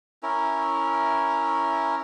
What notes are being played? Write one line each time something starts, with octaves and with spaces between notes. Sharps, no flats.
C#4 E4 A#4